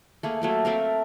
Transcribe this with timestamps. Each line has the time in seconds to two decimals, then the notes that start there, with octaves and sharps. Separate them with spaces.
0.23 A3 A#3 G#4
0.42 F#3 A3 A#3
0.65 A3 C4 A#4